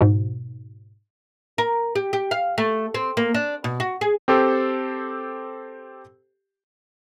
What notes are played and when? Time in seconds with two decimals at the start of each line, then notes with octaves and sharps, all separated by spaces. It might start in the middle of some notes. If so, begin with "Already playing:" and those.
0.01 G#2 B2
1.58 A#4
1.95 G4
2.13 G4
2.31 F5
2.58 A3
2.94 C4
3.17 A#3
3.34 D4
3.64 B2
3.80 F#4
4.01 G#4
4.28 C4 G4 A4 C5